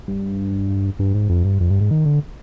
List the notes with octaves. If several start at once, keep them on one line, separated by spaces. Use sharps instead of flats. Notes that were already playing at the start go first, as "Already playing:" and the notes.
G2
G2
G#2
F2
G2
F2
G2
G#2
D#3
D3